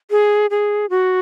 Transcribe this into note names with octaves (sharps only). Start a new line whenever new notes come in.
G#4
G#4
F#4